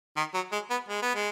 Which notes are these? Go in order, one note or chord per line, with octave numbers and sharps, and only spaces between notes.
D#3
F#3
G#3
B3
G#3
B3
G#3